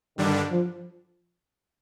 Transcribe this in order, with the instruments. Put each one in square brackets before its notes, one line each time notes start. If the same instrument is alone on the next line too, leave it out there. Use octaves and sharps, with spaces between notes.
[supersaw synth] G2 D3 G3 D4 [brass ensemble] D#3
[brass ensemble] F3